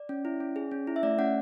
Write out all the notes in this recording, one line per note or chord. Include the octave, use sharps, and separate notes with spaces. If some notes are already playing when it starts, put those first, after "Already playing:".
Already playing: D5
C#4
E4
C#4
G#4
C#4
E4
E5
A3 D5
C#4 F#5